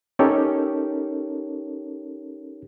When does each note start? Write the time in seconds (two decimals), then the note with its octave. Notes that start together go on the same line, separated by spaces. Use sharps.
0.19 C#4 D#4 G4 A4 A#4 C#5